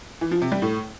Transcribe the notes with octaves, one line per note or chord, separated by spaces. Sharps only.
E3
F3
C3
G3
A2